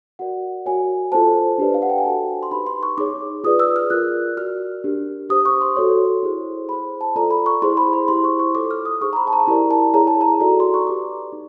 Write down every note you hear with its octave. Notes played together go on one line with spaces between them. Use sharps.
F#4 A#4 D5 F#5
F#4 A#4 C#5 G#5
F4 A4 C5 A5
D4 G4 B4 D5
F5
F#5
G5
G#5
F#4 A4 C5 A5
C6
D#4 G4 B4 B5
C6
C#6
D#4 G#4 C#5 D6
F4 G#4 B4 D5 D#6
E6
F6
F4 A#4 D5 F#6
F#4 A#4 D5 F6
D4 G4 A#4
G4 C5 D#6
C#6
C6
F#4 A4 C#5
E4 G#4 C5
E4 G#4 C5 B5
A5
F4 A4 D5 A#5
B5
C#6
E4 G#4 C5 C6
B5
B5
E4 G4 C5 C6
C#6
C#6
F4 A4 C#5 D6
F6
D#6
D#4 G#4 C5 C#6
A#5
B5
A5
A#5
A5
E4 G4 A#4 D5 A#5
A5
E4 G#4 C#5 A#5
A5
A#5
D#4 F#4 A4 D5 A#5
C6
C#6
G4 B4 D5 D6
D#4